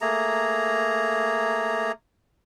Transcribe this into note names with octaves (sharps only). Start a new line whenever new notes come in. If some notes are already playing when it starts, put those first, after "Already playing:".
A3 A#3 G#4 A#5